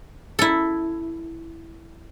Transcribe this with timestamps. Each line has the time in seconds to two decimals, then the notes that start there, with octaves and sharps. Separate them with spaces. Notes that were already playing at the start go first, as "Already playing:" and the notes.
0.39 E4 A4